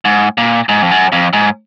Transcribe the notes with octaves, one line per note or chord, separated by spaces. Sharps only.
G#2
A#2
G#2
F2
F#2
F2
G#2